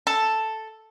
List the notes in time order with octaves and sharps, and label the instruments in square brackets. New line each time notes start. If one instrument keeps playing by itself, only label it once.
[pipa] A4